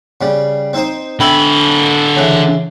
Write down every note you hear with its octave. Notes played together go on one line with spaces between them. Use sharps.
C#3 G3
C4 D#4 C5
D3 E5 G5 B5
C#3 E3